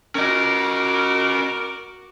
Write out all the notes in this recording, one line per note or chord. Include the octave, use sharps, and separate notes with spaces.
C#4 F#4 A#4 D#5 D6